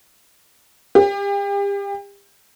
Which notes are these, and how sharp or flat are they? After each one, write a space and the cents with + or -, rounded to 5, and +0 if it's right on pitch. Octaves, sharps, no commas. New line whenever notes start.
G4 +35